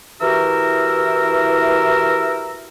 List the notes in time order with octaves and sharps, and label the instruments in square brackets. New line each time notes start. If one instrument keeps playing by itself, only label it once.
[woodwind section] E3 E4 F#4 G4 A#4 E6